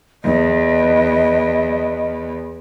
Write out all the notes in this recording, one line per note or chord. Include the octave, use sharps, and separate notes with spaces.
E2 D#5